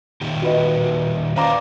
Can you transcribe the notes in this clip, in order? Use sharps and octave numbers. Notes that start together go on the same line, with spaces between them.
A#2 D#3 G4
F#4 B4 D#5
B4 C5 D5 F5 A#5 D6